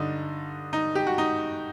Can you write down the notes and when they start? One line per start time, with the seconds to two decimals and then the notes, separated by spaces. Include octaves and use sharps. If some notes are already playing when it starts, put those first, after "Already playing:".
Already playing: G2 D3 D#4
0.73 D#4
0.95 G4
1.07 F#4
1.18 D#4